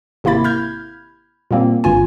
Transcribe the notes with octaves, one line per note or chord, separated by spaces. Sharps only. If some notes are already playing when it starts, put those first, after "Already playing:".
G#1 C3 A#3 E4 B5 A6
B5 F6 G6 G#6
A#2 G3 A#3 C4
G1 G2 F4 G#5